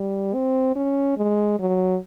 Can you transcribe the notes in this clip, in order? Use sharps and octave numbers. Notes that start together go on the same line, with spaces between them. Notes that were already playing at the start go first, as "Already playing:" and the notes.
Already playing: G3
C4
C#4
G#3
F#3